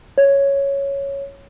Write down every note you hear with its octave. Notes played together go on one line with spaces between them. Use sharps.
C#5